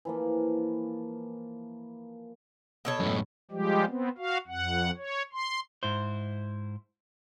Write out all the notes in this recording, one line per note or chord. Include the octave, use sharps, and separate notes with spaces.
E3 F3 A#3
B2 A4 C#5
F#2 A2
F3 G3 G#3 G4
B3 C4
F#4 F5
F2 F#5
C#5
C6
G#2 E4 C5